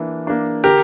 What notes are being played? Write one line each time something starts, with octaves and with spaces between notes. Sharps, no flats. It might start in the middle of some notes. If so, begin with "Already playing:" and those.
Already playing: E3 A#3 D4
A#3 D4
D3 G4 A#4